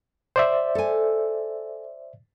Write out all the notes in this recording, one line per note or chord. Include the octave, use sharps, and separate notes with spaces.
C5 D5 E5
A4 G#5